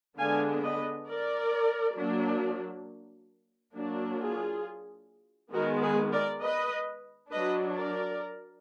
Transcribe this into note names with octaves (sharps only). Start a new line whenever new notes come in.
D3 G#3 B3 D4 F5 G#5
B4 D#5
A#4 D5
F#3 A#3 D4
F#3 A#3 D4
F4 G#4
D#3 G#3 B3 F#4 A#4
G#4 B4
A#4 D5
B4 D#5
F#3 D4 B4 D#5
A#4 D5